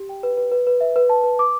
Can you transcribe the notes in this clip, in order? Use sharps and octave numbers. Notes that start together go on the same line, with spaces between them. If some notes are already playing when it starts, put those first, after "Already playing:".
Already playing: G4
G5
B4
B4
B4
B4
E5
B4
A5
B4
D6